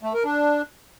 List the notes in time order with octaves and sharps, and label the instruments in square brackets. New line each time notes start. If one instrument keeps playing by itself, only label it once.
[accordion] A3
A#4
D4